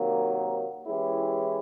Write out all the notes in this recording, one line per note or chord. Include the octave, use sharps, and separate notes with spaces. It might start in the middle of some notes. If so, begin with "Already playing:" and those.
Already playing: C3 D#3 F#3 A#3
E3 G#3 C#4 E4 G4